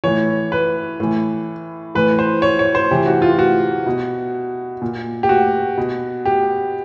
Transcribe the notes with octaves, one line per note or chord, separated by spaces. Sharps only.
A2 E3 C#5
B4
A2 E3
A2 E3 B4
C5
C#5
C#5
C5
C3 E3 G4
F#4
F4
F#4
B2
A#2
G4
F#4
B2
G4